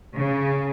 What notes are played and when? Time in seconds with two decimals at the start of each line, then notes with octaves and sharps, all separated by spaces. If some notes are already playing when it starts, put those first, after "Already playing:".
0.15 C#3